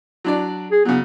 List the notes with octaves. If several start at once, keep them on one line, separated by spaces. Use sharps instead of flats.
F#3 D4 D5
G#4
C#3 F#3 B3